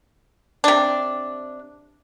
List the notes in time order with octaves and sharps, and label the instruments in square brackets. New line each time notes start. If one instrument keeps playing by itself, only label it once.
[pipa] C3 D4